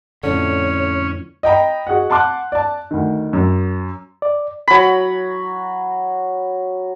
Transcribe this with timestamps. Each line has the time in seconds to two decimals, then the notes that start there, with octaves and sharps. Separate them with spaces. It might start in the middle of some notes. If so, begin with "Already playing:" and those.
0.23 F2 A2 D3 C#4 C#5
1.43 D#5 G5 A#5 B5
1.87 F#4 G#4 D#5 F#5
2.10 F#5 A5 C6 D6 F#6
2.52 D5 A5
2.91 D2 D#3
3.33 F#2
4.22 D5
4.68 F#3 B5